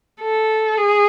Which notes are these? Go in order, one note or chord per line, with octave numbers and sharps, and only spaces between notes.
A4
G#4